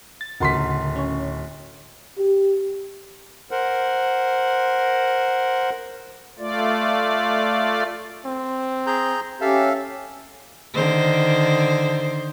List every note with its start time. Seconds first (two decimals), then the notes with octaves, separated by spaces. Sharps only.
0.21 A6
0.40 D1 C#3 F#4 A#4 C6 B6
0.96 C#4 C#5
2.18 G4
3.51 A#4 C5 F#5
6.39 A3 F4 D5
8.25 C4
8.87 G#4 A#5 G6
9.41 C#4 G4 A4 E5 F5
10.74 D3 D#3 C5